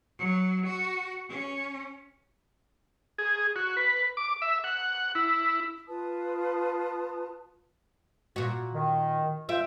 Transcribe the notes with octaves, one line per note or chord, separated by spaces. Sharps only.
F#3
F#4
C#4
G#4
F#4
B4
D6
E5
F#5
E4
F4 B4 A5 D#6
A#2 F#4
D#3
F4 E5 G5